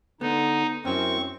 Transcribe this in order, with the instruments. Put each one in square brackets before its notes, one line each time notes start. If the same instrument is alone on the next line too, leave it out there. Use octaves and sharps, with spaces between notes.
[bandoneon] D3 [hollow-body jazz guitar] B3 [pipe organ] D#4
[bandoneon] F#2 C4 [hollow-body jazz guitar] C#4 E4 [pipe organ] C#6